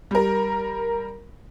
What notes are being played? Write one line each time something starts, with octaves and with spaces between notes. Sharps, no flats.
G3 A#4